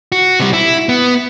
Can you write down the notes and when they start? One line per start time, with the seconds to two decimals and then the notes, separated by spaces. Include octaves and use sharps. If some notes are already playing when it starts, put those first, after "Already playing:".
0.12 F#4
0.40 C3 G3
0.54 E4
0.89 B3